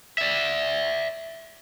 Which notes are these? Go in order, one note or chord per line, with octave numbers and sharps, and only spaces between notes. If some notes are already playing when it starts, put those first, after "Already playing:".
D5 E5